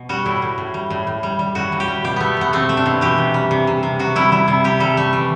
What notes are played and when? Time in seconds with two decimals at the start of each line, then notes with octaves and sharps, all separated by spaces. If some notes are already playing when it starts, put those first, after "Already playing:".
Already playing: B2
0.09 G3 F#4
0.26 A2 E4
0.42 A2
0.58 A2
0.74 G3
0.90 A2
1.07 A2
1.23 G3
1.39 G3
1.55 A2 F#4
1.72 A2
1.80 G4
1.88 G3
2.04 B2 G4
2.16 A3 B3
2.37 B2 B3
2.53 A3 C4
2.69 A3
2.77 D4
2.86 B2
3.01 E3 G4
3.18 C3
3.34 G3
3.51 C3
3.67 C3
3.83 C3
3.99 C3 F#4
4.16 G3 E4
4.32 G3 E4
4.48 C3 E4
4.64 C3 G4
4.80 G3 A4
4.97 A3
5.13 E3